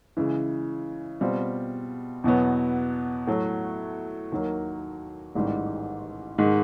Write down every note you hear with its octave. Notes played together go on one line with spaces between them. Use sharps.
C#3 E3 G#3
B2 G3 C4 F4
E2 B2 F#3 B3
A2 F#3 A3
D#2 D#3 F#3 A#3
A1 G#2 D#3 G3
G#2 D#3 G#3